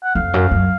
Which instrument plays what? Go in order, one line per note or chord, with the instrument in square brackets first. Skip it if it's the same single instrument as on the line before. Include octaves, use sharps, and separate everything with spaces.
[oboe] F#5
[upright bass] F2 [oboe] F5
[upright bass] F#2
F#2